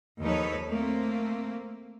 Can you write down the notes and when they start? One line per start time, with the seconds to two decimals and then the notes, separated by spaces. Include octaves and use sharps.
0.21 D#2 F3 D#4 A4 B4 C#5
0.69 A3 A#3 C4